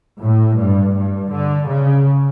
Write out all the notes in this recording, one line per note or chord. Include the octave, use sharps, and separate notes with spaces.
A2
G2
G2
D3
C#3